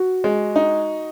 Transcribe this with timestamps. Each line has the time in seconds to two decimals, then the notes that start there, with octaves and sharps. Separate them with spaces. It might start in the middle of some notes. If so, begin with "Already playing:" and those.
Already playing: F#4
0.24 G#3
0.56 D#4